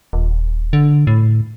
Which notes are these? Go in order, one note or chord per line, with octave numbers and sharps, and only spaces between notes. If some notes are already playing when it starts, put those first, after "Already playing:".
D#1
D3
A2